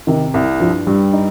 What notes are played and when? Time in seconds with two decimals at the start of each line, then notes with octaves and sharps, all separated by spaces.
0.07 C3 D#3
0.34 C2
0.60 G2 F3
0.87 G2 G3
1.13 D#4